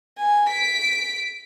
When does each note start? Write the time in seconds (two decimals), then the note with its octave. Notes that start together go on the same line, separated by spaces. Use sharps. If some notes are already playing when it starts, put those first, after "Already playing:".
0.18 G#5
0.49 B6 D7